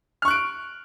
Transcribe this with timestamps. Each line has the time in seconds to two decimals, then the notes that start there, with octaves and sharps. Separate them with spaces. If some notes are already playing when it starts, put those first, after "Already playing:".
0.22 F6
0.25 C#6
0.28 F#6
0.31 D7